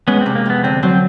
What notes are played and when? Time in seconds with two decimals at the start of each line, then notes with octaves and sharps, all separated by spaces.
0.07 G#3 B3 C#4
0.21 C3 C4
0.35 A#3
0.46 F2 B3
0.64 D3 C4
0.83 F#3 C4